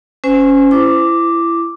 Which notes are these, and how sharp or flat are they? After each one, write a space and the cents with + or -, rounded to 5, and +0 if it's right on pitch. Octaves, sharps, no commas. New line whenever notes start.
C#4 +0 C5 -30 G#5 +0
E4 +25 D6 +0